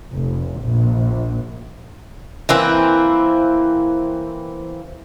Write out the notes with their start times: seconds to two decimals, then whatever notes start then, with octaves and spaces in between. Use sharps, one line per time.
0.13 F1
0.63 A#1
2.49 E3 A#3 C4 E4